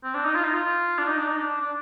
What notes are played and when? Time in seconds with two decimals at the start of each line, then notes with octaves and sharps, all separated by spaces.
0.04 C4
0.14 D4
0.25 D#4
0.35 F4
0.44 D#4
0.53 F4
0.98 D4
1.08 D#4
1.18 D4
1.28 D#4
1.38 D4
1.61 D4